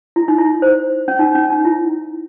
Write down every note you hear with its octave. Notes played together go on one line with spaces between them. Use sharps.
E4
D#4
E4
C5
C#4
D#4
C#4
D#4
E4